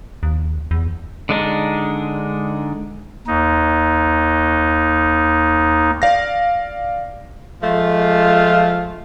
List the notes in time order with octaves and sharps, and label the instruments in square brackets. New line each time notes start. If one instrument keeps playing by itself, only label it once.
[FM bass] D#2
E2
[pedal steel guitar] D3 G#3 D4 D#4
[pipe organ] D#2 D#4
[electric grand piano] D5 F5 A#6
[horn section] F3 G#3 A3 F4